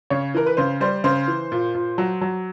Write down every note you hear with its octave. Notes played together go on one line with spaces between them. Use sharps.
C#3 C#5
E3 A#4
B4
C#3 C5
G3 C5
C#3 C5
E3
A#2
A#2
F#3
F#3